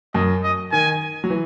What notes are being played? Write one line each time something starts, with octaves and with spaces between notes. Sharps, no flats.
F#2 D#5
D#5
D#3 G#5
F#3
E3